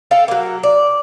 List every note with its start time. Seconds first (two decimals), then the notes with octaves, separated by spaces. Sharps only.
0.11 A4 F5 G5
0.28 F#3 A#3
0.63 D5